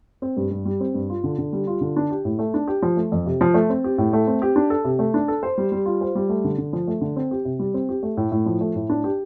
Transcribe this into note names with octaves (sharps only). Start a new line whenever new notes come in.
C4
G2
G2
G3
C4
G2
F4
D3
D3
G3
F4
D3
D4
G4
A2
A3
D4
G4
F3
A3
F2
C3
F3
A3
C4
G4
A2
A3
C4
G4
D4
A4
C3
A3
D4
A4
C5
G3
G3
F4
C5
G3
A3
D3
D3
F3
A3
D3
C4
G4
C3
G3
C4
G4
A3
A2
A2
F3
A3
A2
D4
G4